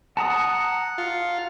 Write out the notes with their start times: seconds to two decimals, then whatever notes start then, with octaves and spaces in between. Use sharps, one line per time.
0.17 F#5 A5 A#5 D#6
0.98 F4